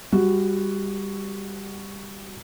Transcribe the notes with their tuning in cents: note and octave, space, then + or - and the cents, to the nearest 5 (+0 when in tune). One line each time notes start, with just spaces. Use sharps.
G3 +20 F#4 +0